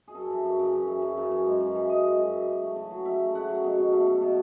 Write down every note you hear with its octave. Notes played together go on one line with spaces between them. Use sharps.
G#4
F#2 A4
E3
F#2
C#3
F#2
E3
F#2
C#3
F#2
G#3
F#2
E3
F#2 D#5
G#3
F#2
E3
C#3
A3
C#3
F#3
C#3 E5
A3
C#3 F#5
F#3
B2
B2
A3
A3
B2